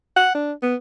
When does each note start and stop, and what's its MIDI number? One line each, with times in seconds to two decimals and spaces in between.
0.17 0.34 78
0.35 0.53 62
0.63 0.75 59